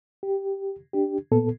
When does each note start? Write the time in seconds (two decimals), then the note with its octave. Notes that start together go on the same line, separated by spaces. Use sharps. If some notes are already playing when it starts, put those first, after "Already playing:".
0.23 G4
0.94 D4 G4
1.32 A#2 B3 A4